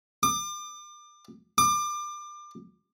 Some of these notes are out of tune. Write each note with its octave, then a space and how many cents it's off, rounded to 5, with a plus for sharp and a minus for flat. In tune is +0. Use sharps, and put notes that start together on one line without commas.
D6 +35
D6 +30